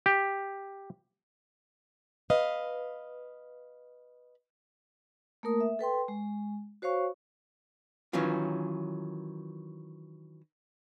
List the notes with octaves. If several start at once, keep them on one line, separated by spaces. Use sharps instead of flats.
G4
B4 D#5 F5
A3 A#3 A#4 D#6
E5
A4 B4 G5 C6
G#3
F#4 C5 C#5 F5 C#6
D#3 E3 F#3 C#4 F4